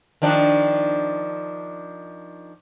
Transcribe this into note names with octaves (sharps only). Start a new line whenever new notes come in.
D#3 F3 D4